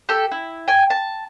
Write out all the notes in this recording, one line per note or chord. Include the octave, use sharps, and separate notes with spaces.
G4 A4
E4
G5 G#5
A5